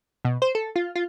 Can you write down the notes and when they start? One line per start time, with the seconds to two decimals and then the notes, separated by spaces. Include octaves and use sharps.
0.25 B2
0.42 C5
0.55 A4
0.76 F4
0.96 F4